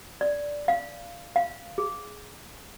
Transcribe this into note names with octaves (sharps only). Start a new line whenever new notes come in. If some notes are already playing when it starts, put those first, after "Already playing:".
D5
F5
F5
G#4